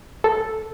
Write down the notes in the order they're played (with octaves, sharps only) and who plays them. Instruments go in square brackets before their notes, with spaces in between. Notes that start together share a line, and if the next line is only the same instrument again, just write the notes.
[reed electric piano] A4